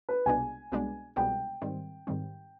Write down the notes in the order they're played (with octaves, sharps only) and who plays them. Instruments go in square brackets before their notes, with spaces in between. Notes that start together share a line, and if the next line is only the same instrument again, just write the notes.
[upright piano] B4
[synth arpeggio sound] C2 B2 G#3 B3 D4 [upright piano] G#5
[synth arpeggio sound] C2 B2 G#3 B3 D4
[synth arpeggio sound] C2 B2 G#3 B3 D4 [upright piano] G5
[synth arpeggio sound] G#2 D#3 G3 C4
G#2 D#3 G3 C4